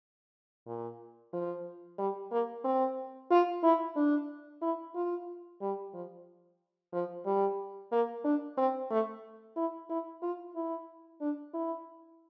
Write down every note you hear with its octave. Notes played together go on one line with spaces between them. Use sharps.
A#2
F3
G3
A#3
C4
F4
E4
D4
E4
F4
G3
F3
F3
G3
A#3
D4
C4
A3
E4
E4
F4
E4
D4
E4